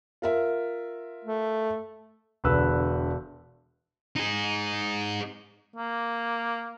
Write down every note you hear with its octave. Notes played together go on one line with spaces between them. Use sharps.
F4 A#4 E5
A3
E1 D3 B4 E6
D#4 G#4
A#3